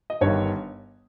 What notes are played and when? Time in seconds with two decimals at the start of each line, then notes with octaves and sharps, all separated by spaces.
0.10 D#5
0.21 G1 G2 D#3 C#5